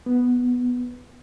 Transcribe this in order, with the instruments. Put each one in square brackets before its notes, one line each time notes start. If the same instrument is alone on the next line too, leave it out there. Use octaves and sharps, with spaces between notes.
[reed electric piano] B3